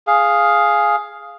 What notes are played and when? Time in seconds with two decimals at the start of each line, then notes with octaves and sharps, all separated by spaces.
0.07 G#4 F5